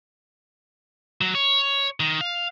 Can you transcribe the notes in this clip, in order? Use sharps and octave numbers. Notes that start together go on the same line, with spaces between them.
F#3
C#5
D#3
F5